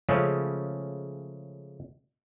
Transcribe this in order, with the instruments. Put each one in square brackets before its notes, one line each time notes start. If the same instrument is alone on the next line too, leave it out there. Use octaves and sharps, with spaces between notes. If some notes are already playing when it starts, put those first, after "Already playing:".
[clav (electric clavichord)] C#3 F3 G#3 A3 C#4